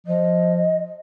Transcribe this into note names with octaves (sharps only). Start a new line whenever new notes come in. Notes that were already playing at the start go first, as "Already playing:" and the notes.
F3 D#5